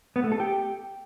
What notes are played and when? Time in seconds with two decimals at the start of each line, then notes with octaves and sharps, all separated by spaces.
0.16 B3
0.24 A3
0.32 A4
0.40 G4